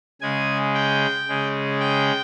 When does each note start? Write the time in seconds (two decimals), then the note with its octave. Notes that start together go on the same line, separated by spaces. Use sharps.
0.21 C#3 G#3 G#5
0.74 G5
1.28 C#3 G#3
1.80 G5